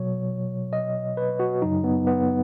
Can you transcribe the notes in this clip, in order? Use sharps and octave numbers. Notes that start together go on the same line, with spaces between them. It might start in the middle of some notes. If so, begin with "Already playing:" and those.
Already playing: B2 F#3 C#5
D#5
B4
F#4
F#2 C#3 F#3 D#4
B3
B3